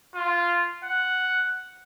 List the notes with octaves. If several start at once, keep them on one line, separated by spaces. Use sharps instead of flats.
F4
F#5